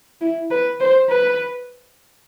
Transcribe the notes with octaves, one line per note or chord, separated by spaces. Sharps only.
E4
B4
C5
B4